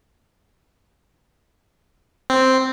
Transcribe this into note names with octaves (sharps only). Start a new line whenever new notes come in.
C4